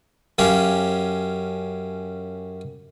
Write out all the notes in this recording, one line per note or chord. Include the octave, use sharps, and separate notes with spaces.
F#2 C#4 G4 F5